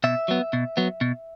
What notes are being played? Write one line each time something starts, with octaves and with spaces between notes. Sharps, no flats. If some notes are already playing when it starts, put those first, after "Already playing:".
B2 E5
F#3 B3
B2
F#3 B3
B2